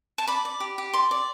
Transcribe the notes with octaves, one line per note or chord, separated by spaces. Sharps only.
A5
D5 B5
D5
G4
G4
D5 C6
D5